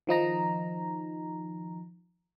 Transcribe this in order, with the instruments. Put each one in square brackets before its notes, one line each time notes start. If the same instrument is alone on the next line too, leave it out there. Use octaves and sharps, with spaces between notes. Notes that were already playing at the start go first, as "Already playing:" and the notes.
[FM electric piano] D#3 F3 D#4 A#5